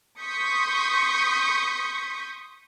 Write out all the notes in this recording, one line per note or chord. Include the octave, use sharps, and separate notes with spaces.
C6 C#6 D#6 G6 B6 C#7